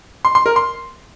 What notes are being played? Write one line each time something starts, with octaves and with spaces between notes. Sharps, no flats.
C6
C6
A#4
C6